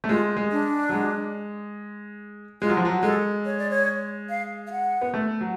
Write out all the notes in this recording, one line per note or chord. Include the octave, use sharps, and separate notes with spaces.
A3
G#3 F4
G#3
D4
F#3
G#3
G#3 F4
F#3
F3
F#3
G#3 A4
C#5
D5
C#5
F5
F5
F#5
B3
A3
F#3